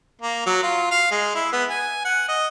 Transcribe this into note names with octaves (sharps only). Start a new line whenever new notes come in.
A#3
F#3
F4
F5
G#3
E4
B3
G#5
F#5
D#5